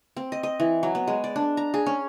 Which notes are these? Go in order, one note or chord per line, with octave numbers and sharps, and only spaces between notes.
C4
D#5
D#5
E3
F#3
B3
G#3
D5
D4
A#5
G#4
C#4